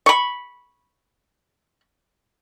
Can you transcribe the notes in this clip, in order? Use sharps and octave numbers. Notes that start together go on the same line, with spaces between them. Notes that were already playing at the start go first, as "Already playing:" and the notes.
B5 C#6